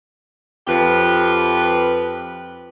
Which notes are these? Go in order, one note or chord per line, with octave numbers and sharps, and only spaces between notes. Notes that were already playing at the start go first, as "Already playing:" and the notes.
F2 F3 G4 B4